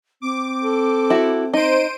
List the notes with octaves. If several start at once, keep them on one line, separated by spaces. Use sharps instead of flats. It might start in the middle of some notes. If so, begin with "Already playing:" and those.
C4 D6
A4
E4 F#4
D#4 C5 D7 D#7